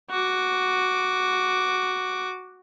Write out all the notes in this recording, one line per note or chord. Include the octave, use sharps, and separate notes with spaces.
F#4 D6